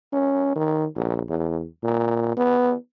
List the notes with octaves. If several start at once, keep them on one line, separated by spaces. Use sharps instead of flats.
C#4
D#3
A#1
E2
A#2
B3